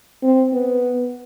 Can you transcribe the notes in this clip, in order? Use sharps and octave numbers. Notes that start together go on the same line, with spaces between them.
C4
B3